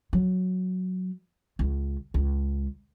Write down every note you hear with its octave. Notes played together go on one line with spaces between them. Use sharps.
F#3
C#2
C#2